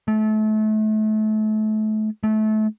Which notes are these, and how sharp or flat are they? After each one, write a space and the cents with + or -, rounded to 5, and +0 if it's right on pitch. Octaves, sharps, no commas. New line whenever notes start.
A3 -30
A3 -25